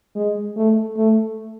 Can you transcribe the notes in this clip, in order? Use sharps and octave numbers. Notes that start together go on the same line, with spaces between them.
G#3
A3
A3